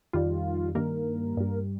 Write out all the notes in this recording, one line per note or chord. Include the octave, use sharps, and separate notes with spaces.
F2 D#3 G3 F4
G2 D#3 G3 A#3 A#4
G2 G3